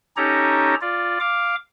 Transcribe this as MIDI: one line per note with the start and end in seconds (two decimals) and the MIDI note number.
0.17 0.75 61
0.17 0.75 63
0.17 0.75 67
0.17 0.75 69
0.17 0.75 73
0.17 0.75 82
0.81 1.18 65
0.81 1.18 74
1.20 1.55 77
1.20 1.55 86